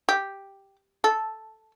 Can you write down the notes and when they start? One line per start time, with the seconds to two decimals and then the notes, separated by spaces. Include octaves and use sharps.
0.09 G4
1.04 A4